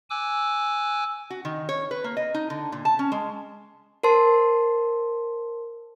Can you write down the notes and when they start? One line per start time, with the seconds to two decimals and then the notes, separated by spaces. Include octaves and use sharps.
0.10 G#5 D6 E6 F#6
1.30 F#4
1.45 D#3
1.69 C#5
1.91 B4
2.04 A#3
2.17 D#5
2.34 D#4
2.50 D3
2.72 A#2
2.85 A5
2.99 C#4
3.12 G#3
4.03 A#4 C5 A5 C6